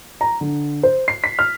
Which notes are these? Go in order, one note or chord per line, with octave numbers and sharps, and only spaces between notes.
A#5
D3
C5
C7
B6
F6